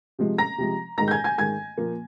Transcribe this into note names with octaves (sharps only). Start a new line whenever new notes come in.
C3 F3 G#3
A#5 A#6
C3 F3 G#3
G#2 D#3 G#3 A#5 A#6
G6
G#5 G#6
G#5 G#6
G#2 D#3 G#3 G#5 G#6
A#2 F3 A#3